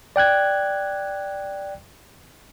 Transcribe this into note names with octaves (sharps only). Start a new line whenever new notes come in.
D5 G5 F#6 G#6